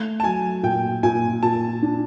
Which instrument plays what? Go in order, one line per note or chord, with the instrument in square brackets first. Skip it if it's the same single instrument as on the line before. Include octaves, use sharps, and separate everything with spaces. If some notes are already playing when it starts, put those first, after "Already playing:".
Already playing: [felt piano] A3
[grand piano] A5
[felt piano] F#3 [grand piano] G#5
[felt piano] A#2 [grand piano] G5
[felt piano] A#2 [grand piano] G#5
[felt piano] A#2 [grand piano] A5
[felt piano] D4